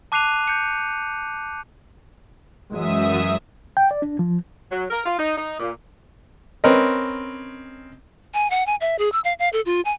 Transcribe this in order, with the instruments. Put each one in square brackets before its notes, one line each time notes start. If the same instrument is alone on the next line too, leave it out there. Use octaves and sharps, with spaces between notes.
[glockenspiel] A5 D6 F#6 C7 D#7 F7
G6 C#7
[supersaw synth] F#2 E5 D#6 [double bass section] E3 F#3 G#3
[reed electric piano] G5
D5
D4
F3
[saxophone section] F#3
A#4
F4
D#4
D#4
A#2
[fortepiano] C4 C#4 A#4 B4 D#5
[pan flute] G#5
F#5
G#5
E5
G#4
E6
F5
F5
A4
F4
G#5